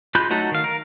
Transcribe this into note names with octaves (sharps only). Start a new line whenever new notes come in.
G#3 F4 B5 F#6 G6
F#3 A3 D#4 F#4 A4
D#3 F5
A#4